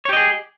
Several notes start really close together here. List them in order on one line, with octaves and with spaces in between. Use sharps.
C#5 G4 D#5 G#4